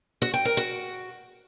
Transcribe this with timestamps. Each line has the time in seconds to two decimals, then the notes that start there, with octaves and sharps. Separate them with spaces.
0.22 F#4
0.33 G5
0.45 A#4
0.57 F#4